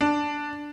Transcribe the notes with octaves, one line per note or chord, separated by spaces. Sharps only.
D4